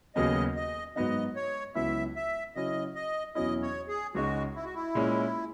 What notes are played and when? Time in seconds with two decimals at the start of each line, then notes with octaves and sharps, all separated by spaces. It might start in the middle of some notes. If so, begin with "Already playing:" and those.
0.16 D#2 C#3 F#3 B3 D#5
0.56 D#5
0.96 G#2 F#3 B3 D#4 D#5
1.36 C#5
1.75 C#2 C#3 F#3 B3 E4 E5
2.16 E5
2.55 C#3 F#3 C#4 E4 D#5
2.95 D#5
3.35 E2 B2 F#3 C#4 E4 D#5
3.62 C#5
3.88 G#4
4.15 C#2 C#3 G#3 D#4 F#4
4.55 E4
4.65 F#4
4.74 E4
4.95 A#2 G#3 C#4